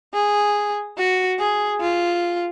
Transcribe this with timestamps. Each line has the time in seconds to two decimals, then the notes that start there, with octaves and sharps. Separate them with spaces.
0.14 G#4
0.98 F#4
1.39 G#4
1.81 F4